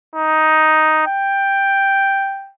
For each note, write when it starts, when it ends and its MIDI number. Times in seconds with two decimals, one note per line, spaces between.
0.16 1.07 63
1.07 2.51 79